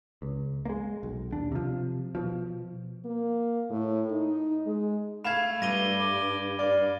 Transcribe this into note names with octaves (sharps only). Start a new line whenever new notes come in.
C#2
G#3 A#3
B1
D#2 D4
C3 F3
B2 F3
A#3
A2
D#4
G#3
A3 F5 B5 G#6 E7
G2 A#6 D#7 G7
D5
D5 F5